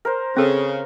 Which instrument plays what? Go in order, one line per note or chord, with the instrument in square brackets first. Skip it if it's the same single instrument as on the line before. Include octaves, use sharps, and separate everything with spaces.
[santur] A#4 C5
[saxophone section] C#3 [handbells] C4 A4